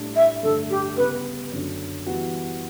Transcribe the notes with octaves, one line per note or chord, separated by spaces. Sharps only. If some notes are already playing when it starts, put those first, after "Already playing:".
Already playing: A2 G3 D4
E5
G2 D3 A3 A4
G4
C#3 G3 B3 B4
F#2 D3 F#3 C#4
E3 G3 B3 F#4